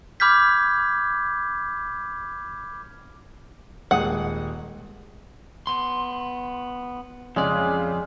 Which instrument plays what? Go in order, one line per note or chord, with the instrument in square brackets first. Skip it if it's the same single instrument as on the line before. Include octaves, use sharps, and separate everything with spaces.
[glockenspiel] B5 D6 F6 G6 G#6 B6
[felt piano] D#1 G#3 D#6 [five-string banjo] F#5
[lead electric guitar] B3 C6
[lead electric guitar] F2 D5 [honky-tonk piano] C#3 [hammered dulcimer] G#3